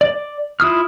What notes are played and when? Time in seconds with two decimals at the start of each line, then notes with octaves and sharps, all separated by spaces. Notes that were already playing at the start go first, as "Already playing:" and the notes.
0.01 D5
0.60 E4 F4 D#6 F6